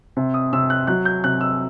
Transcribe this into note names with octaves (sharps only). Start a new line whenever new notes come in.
C3
D#6
C3 E6
F#6
F#3 F#6
G6
C3 F#6
E6